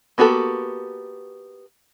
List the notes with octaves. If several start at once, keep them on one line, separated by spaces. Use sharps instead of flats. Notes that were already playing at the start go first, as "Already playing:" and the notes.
A#3 B3 F#4 G4 A4